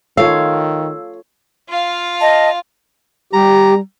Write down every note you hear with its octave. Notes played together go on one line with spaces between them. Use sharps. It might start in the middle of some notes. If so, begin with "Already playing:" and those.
D#3 F4 A4 C#5 F5 E6
F4 F5
D#5 A5
G3 G4 A#5